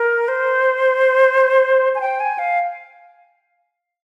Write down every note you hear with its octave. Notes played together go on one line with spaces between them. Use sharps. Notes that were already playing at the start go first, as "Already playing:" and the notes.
Already playing: A#4
C5
G#5
G5
G#5
F5